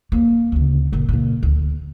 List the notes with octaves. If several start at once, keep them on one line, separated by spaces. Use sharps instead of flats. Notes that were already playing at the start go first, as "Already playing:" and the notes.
A#3
D2 C#3
F#1 A#2
F#1 A#2
D2